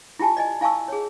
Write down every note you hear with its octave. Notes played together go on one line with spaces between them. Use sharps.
E4 F4 G4 G#5 A5
D5 D#5 G#5
E4 F5 G#5 A5 C#6 E6
G#4 C#5